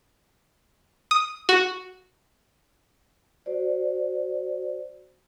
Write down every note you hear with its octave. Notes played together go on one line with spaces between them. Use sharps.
D#6
F#4
F#4 C5 D5